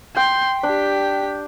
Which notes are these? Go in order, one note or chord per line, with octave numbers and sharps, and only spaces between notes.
G5 C6
D4 G4 B6